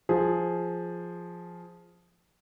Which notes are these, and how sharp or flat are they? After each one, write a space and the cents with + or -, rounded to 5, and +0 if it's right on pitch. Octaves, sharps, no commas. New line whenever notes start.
F3 +0 G#4 +0